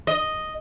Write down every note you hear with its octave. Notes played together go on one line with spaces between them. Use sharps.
D#5